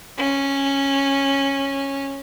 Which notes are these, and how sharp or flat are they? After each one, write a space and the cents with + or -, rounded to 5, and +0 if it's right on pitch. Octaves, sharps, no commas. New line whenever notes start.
C#4 -10